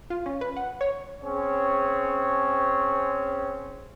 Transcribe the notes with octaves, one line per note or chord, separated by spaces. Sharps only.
F4
C#4
B4
F#5
C#5
C4 C#4 G#4 C#5